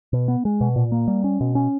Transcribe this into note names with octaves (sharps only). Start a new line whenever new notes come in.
B2
B3
G#3
B2
A#2
A#3
G3
C#4
B2
C#4